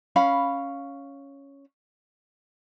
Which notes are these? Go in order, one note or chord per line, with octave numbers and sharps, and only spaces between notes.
C#4 F5 B5